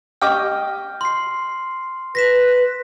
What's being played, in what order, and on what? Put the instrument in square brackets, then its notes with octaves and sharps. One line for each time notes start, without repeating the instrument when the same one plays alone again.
[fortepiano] G4 D#5 D6 [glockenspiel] F6
[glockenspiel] C6 C7
[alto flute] B4 [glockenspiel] A#6 B6 E7